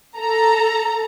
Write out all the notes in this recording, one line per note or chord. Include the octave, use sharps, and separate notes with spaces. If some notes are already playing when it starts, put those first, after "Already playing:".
A4 A#5